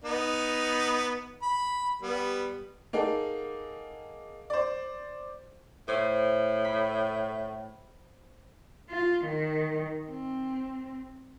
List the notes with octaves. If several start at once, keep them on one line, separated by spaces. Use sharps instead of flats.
B3 D#4
B5
G3 B3
A#3 D#4 G#4 A4 F#5
C5 D5
A2 C5
B5
F4
D#3
C4